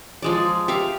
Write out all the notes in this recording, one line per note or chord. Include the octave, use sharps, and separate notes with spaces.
F3 G#3 D5
G4 E5 F5